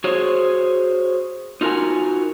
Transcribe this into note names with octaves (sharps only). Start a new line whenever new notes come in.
F#4 G#4 C5 C#5
D#4 F4 F#4 A#4 F#5 G#5